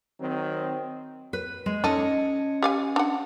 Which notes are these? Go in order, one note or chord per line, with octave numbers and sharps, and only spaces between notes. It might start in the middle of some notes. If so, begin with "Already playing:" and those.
D#3 F#3 C4
B4
G#3
C#4 D#4 A4 D#5
G4 F5 G#5
D4 F#5